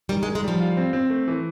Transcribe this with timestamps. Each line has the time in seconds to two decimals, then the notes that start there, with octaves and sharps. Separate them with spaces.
0.09 D#3 G3
0.23 G#3
0.26 D#3
0.35 G#3
0.44 F3 G3
0.60 F4
0.77 C4
0.93 C4
1.10 A3
1.28 E3